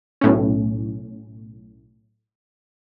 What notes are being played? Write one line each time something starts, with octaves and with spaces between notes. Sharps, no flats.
B1 A2 C#4